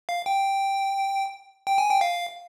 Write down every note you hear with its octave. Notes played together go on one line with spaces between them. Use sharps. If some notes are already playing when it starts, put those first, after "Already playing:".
F5
G5
G5
G#5
G5
F5